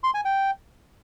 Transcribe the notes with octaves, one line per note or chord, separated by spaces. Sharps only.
C6
G#5
G5